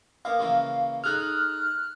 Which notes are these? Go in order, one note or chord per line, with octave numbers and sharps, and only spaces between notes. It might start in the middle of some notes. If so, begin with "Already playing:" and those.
A#3 B3 F5
C#3 E3 A#3
D#4 G#4 A4 F6 F#6